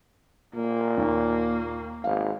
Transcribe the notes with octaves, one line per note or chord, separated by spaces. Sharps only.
A#2 A#3
D#2
G#1 F5